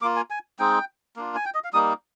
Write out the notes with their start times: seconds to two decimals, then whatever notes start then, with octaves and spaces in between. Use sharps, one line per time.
0.02 A#3 D6
0.04 F4
0.16 G#5
0.30 G#5
0.59 G#3 C4 D#4 G5
1.16 A#3 D4 F4
1.35 G#5
1.45 G5
1.54 D#5
1.64 F5
1.73 G3 A#3 D#4 D#6